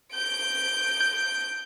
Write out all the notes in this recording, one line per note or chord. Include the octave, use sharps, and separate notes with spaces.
G6 D7